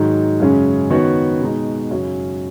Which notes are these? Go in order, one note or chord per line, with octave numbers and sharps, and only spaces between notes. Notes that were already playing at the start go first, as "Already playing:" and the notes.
Already playing: G#2 D#3 F#3 D#4 F#4
F#2 C#3 G#3 C#4
D#3 B3 F#4 C#5
B2 G#3 D#4
F#2 C#3 F#3 C#4